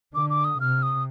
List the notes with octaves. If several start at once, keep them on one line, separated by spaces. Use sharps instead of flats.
D3 D6
D6
D#6
C3 F6
D#6